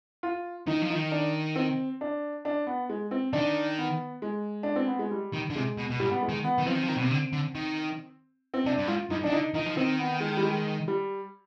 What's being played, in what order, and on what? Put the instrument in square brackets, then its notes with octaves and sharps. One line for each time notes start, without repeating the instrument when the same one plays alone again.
[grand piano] F4
[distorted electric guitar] D#3 [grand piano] D#4
[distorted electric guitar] F3
[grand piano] D#4
[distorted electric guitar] D#3
[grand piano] D4
C4
D4
D4
B3
G#3
C4
[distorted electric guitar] D#3 [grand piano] D4
[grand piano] B3
G#3
D4
C4
B3
G#3
G3
[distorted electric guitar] D#3
D3
[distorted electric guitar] C3 [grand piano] G#3
[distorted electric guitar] B2
B2
[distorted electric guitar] G#2 [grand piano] G3
[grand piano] B3
G#3
[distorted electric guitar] D#3
[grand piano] B3
[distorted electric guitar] D#3
[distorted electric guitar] F3 [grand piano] C4
[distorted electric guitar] D#3
F3
D#3
B2
C3
D3
D3
D#3
[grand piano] C4
[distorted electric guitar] C3 [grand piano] D4
[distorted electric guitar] G2
[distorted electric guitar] G#2 [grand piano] F4
[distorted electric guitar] G2 [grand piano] D#4
[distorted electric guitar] D#3 [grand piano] D4
[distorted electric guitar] D3 [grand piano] D#4
[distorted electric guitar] D#3 [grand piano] D#4
[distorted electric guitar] F3
[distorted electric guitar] D#3 [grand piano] C4
[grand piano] B3
G#3
G3
G#3
G3